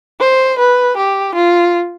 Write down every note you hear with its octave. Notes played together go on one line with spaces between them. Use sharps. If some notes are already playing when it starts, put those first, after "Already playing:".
C5
B4
G4
F4